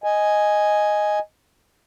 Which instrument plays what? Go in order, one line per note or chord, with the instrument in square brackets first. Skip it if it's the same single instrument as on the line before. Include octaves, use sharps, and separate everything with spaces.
[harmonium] D#5 G#5